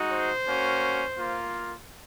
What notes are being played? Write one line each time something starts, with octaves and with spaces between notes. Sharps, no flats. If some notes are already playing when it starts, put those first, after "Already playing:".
Already playing: G#3 D#4 F#4
C5
A#3 C#4 F#4
A#3 F4